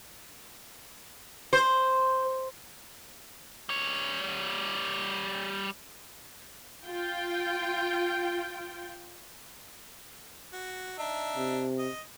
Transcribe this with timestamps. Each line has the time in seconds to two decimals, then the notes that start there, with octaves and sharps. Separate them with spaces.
1.53 C5
3.69 G3 C#5
6.84 F4 G5
10.53 F#4
10.98 D4 D#4 E5
11.36 C3
11.79 D#5